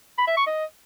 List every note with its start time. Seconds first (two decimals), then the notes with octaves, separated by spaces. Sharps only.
0.18 B5
0.28 E5
0.37 C#6
0.47 D#5